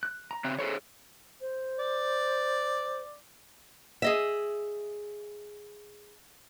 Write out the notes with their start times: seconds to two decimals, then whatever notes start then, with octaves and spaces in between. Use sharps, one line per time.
0.03 F#6
0.31 A#5
0.44 C#3 C4 F#6
0.59 G#4 A4 C5 C#5
1.41 C5
1.79 D5
4.02 G#4 D#5 E5